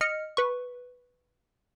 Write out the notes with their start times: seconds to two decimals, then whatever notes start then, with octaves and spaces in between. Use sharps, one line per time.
0.01 D#5 F6 C#7
0.37 B4 C#6